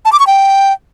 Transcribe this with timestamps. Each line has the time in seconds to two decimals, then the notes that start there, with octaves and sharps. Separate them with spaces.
0.05 A5
0.12 D6
0.20 C#6
0.27 G5